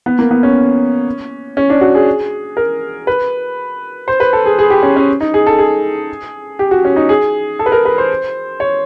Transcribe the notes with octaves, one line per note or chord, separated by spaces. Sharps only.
B3
A#3
B3
C#4
C#4
D4
F#4
G#4
A#4
B4
C5
B4
A4
G#4
G#4
G4
C#4
C#4
D#4
G#4
A4
G#4
G4
F#4
C#4
D#4
G#4
A4
B4
A#4
B4
C5
C#5